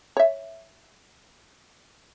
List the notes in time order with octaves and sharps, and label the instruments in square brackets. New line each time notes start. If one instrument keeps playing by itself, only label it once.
[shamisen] C#5 E5